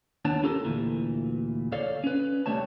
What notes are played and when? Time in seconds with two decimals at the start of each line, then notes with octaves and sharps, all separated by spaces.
0.25 D#2 B3 D4 C#5 A5
0.43 C#4 F4 G4 A4 A#4
0.64 D2 A#2 E3
1.72 A4 C#5 D5 F5
2.04 C#4 B4
2.46 C2 F3 G3 A3 C#5 A5